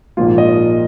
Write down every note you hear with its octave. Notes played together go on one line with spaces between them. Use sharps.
A#1 G#2 F3 A#3 F4
D#5